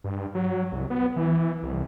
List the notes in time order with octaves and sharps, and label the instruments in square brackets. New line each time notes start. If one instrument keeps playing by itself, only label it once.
[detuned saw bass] G2
F#3
C2
B3
E3
C2